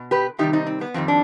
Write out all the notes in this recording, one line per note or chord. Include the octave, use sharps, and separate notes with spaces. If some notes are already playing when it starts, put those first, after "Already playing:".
Already playing: B2
G4 B4
C3 D#3 G3 D#4 G4
C4 D#4
C4
B3
F2 D#3 G3 C4
D4